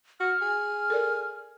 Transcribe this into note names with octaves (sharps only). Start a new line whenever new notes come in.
F#4 F6
G#4
A4 A#4 D5